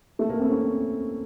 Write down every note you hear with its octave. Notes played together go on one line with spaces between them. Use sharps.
A3
A#3
C4
C#4